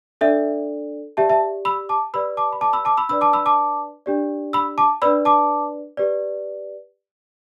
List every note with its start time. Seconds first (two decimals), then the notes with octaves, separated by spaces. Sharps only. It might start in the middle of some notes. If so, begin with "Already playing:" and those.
0.21 D4 A4 D5 E5
1.17 G4 D5 E5 A5
1.30 E5 A5
1.65 B5 E6
1.89 A5 D6
2.14 G4 B4 D5 B5 E6
2.37 A5 D6
2.52 B5
2.61 A5 D6
2.73 B5 E6
2.85 A5 D6
2.97 B5 E6
3.09 D4 B4 D5 B5 E6
3.21 A5 D6
3.33 B5 E6
3.46 A5 D6
4.06 D4 G4 D5
4.53 B5 E6
4.78 A5 D6
5.02 D4 B4 D5 B5 E6
5.25 A5 D6
5.97 G4 B4 D5